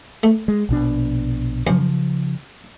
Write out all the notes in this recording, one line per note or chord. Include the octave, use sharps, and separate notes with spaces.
A3
G#3
A#1 B2 D4
F#2 C#3 F3